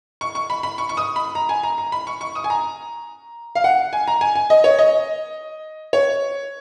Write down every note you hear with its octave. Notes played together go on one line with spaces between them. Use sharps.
C#6
C#6
B5
B5
C#6
C#6
D#6
B5
A#5
G#5
A#5
A#5
B5
C#6
C#6
D#6
G#5
A#5
F5
F#5
G#5
A#5
G#5
G#5
D#5
C#5
D#5
C#5